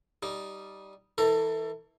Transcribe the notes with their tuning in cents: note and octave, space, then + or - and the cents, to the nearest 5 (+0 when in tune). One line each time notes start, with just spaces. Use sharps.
G3 -10 D#4 +0
E3 -25 A4 +25 A#5 +0